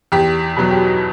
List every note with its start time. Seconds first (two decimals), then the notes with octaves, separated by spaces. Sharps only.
0.12 E2 G4
0.57 B2 F#3
0.71 G4